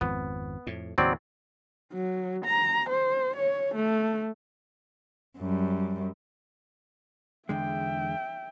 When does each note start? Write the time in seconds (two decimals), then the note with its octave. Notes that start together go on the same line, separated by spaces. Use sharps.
0.01 G#1 F2 F3 B3
0.67 F2 A2
0.98 D#2 A2 C#3 F#3 C4 D5
1.92 F#3
2.45 A#5
2.89 C5
3.36 C#5
3.75 A3
5.39 F#2 G3
7.49 E2 D3 G#3 E5 G5